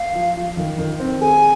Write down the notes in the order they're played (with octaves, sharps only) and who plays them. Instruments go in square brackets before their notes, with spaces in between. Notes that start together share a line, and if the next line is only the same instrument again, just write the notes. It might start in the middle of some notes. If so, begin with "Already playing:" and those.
Already playing: [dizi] F5
[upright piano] F3
F3
D#3
D#3
C4
[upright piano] G#4 [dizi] G#5